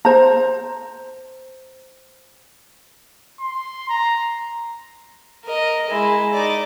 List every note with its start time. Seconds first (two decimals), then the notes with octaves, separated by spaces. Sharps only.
0.05 C5 A#5
3.40 C6
3.89 A#5
5.44 A#4 D#5
5.89 G#3 E4
6.33 D#4 D5